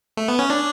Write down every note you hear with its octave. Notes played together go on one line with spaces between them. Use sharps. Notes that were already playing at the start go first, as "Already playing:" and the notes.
A3
B3
C#4
D4